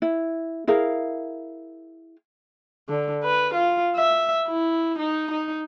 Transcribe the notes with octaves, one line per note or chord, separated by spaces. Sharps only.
E4
E4 G#4 A#4 F5
D3
B4
F4
E5
E4
D#4
D#4